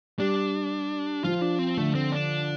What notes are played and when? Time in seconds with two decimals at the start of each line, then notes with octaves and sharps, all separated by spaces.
0.19 G3 D4
1.24 F3 F4
1.42 D4
1.59 C4
1.77 D3 A3
1.95 C4
2.12 D4